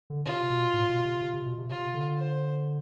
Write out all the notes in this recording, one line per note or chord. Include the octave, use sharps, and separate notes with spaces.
D3
C3 F4
B2
A2
B2
C3
C3
C3
B2
C3
C3 F4
D3
C5